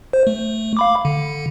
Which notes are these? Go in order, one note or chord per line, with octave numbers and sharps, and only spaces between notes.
C5
A3
F5 B5 D6
D3